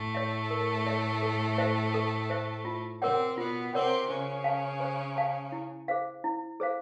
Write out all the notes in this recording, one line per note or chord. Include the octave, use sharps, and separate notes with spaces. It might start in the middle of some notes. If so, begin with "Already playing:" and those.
Already playing: A2 A3
C#5 E5
A#4
C#5 E5
A4
C5 E5
A4
C5 E5
F4
C3 C4 A#4 C#5 F#5
B2 B3 F4
C3 C4 A#4 C#5 F#5
C#3 C#4 C5
F5 A5
C5
F5 A5
E4
G#4 C5 F5
E4
G#4 C5 F5